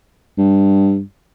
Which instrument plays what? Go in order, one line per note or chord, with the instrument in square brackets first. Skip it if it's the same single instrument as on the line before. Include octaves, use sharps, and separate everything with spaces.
[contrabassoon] G2